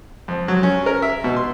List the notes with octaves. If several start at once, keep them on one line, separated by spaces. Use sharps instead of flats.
F2
F#3
C#4
A#4
E5
B2
C6